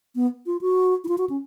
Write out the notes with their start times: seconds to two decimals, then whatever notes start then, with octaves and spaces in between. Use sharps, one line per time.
0.15 B3
0.46 F4
0.61 F#4
1.04 E4
1.08 F4
1.18 F#4
1.29 C#4